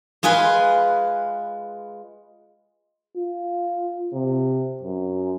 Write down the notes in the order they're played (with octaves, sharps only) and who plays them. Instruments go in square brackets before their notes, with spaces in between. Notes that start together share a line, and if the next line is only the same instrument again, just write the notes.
[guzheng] G#3 F4 G#4 B4
[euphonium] F4
C3
F#2